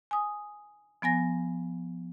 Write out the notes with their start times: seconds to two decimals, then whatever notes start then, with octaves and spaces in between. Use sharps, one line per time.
0.11 G#5 D#6
1.02 F3 B3 G#5 A#6